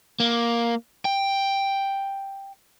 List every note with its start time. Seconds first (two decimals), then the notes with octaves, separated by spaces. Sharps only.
0.20 A#3
1.05 G5